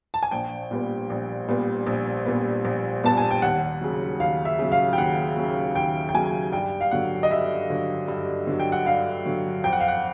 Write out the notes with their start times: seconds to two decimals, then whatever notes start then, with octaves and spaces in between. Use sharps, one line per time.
0.14 A5
0.23 G#5
0.31 A#1 G5
0.71 A#2 G3 B3
1.10 A#1
1.48 A#2 G3 B3
1.87 A#1
2.26 A#2 G3 B3
2.65 A#1
3.04 A#2 G3 B3 A5
3.18 G#5
3.31 G5
3.42 D#2 F#5
3.81 C#3 F#3
4.20 D#2 F5
4.45 E5
4.59 C#3 F#3
4.72 F5
4.93 G5
4.98 D#2 F#5
5.37 C#3 F#3
5.75 D#2 G5
6.09 G5
6.14 C#3 F#3 G#5
6.53 G2 G5
6.81 F5
6.91 D3 F#3 F#5
7.23 D#5
7.31 G2 E5
7.70 D3 F#3
8.08 G2
8.47 D3 F#3
8.60 G5
8.72 F#5
8.86 G2 F5
9.25 D3 F#3
9.64 F2 G5
9.73 F#5
9.80 F5
9.88 F#5